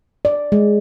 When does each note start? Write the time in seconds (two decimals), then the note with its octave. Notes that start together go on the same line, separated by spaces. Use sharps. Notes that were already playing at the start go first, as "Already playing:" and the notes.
0.25 D5
0.52 G#3